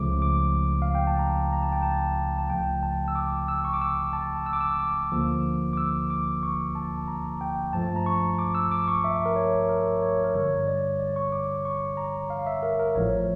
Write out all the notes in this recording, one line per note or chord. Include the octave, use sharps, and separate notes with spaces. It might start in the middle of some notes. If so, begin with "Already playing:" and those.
Already playing: C#2 C#3 F3 A3 D6
D6
F5
G5
A5
A#5
A#5
A5
G5
A5
A5
C#2 C#3 F3 A3 G5
A5
E6
D6
E6
C#6
D6
E6
A5
E6
D6
E6
D6
D2 D3 F3 A#3
D6
E6
D6
C#6
A5
A#5
G5
G2 F3 A3 A5
A#5
C#6
D6
E6
D6
C#6
E5
A#4
C#5
A#4
C#5
A#4
G2 D3 G3 C#5
D5
D5
C#6
D6
C#6
A#5
F5
E5
A#4
A#4
A1 A2 F3 A3 C#5